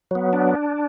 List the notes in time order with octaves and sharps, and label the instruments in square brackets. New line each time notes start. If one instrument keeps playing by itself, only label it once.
[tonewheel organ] F#3 B3
D4